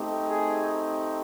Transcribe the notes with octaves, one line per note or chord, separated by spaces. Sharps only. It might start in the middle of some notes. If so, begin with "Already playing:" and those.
Already playing: A3 C4 D#4 G4
G#4